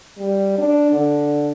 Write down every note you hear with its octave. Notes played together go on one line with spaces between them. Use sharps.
G3
D4
D3